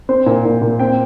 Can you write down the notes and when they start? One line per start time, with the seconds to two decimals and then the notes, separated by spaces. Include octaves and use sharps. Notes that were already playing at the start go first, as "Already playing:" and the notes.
0.09 C4 C5
0.26 A#2
0.45 A#2
0.62 A#2
0.79 C4 G5